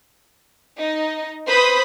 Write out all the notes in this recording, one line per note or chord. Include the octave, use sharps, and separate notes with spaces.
D#4 D#5
B4 C5 B5 D#6